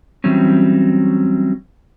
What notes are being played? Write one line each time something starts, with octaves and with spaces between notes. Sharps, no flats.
E3 F#3 G3 C4 C#4